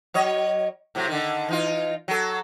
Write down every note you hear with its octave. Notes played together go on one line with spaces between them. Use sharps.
F#3 C#5 D#5
A2 C3 F#3
D3 D#3
E3 D#4 F4
F#3 A4